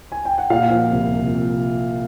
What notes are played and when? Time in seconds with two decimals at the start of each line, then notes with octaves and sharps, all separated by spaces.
0.12 G#5
0.25 G5
0.38 F#5
0.50 A#2 F5
0.70 F3
0.91 C2
1.12 C2